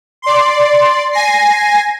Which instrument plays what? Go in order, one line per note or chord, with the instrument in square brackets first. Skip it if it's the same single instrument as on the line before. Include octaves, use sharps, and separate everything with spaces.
[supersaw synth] D5 C6
G#5 A#6 C7